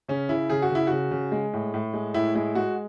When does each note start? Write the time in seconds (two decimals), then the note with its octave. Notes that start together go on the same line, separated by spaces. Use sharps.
0.08 C#3 C#4
0.29 C#3 E4
0.50 C#3 G#4
0.62 F#4
0.70 C#3
0.75 E4
0.87 C#3 F#4
1.11 C#3
1.32 G#3
1.53 A2
1.74 A2
1.94 G#3
2.14 A2 E4
2.35 G#3 E4
2.55 G#3 F#4